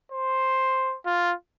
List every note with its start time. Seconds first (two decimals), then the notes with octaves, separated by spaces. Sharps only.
0.12 C5
1.06 F4